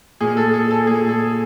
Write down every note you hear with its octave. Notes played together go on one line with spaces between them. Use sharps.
A#2 G#4
A4
A4
A4
A#2 G#4
A4